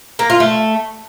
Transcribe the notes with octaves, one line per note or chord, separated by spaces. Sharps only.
A#3
F4
A3